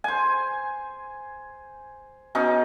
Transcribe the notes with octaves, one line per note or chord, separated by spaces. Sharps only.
C5 G#5
B2 C#4 D#4